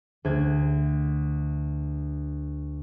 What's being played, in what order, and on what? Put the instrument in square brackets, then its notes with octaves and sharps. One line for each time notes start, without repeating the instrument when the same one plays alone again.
[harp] D2 G#6